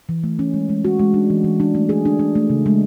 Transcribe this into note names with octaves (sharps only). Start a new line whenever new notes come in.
E3
A3
C#4
G#3
G#3
F#4
G#3
D4
E3
E3
D4
A3
G#4
D4
D4
A3
C#3
G#3